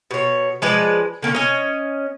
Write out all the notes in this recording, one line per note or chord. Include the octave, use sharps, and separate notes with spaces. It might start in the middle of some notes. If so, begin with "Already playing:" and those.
B2 C#5
F3 G#3 B4 D5
D3 A#3 C#4
C#4 D#5